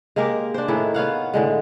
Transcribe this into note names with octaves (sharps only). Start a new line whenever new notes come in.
G#3 A#3 G4 A#4
D4 C5
A2 D#3 G#3 E4
B3 C#5 F5 F#5
A2 D3 G#3